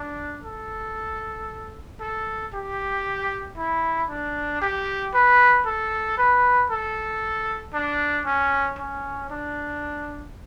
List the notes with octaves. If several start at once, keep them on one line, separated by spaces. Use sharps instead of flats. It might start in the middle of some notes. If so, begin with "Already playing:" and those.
Already playing: D4
A4
A4
G4
E4
D4
G4
B4
A4
B4
A4
D4
C#4
C#4
D4